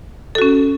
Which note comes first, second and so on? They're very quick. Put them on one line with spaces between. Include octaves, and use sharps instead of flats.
A4 F#4 C#4